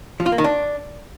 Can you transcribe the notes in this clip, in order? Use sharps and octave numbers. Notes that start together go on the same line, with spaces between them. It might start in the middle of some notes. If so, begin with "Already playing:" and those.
F3
F4
A#3
D#3
D4